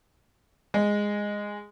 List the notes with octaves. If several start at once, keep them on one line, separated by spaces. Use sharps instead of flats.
G#3